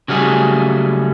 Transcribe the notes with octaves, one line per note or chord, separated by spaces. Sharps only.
C#3 F#3 G3 A3 G#4